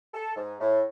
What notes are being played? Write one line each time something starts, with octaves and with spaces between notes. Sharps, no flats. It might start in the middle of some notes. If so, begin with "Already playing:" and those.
A4
G#2
A2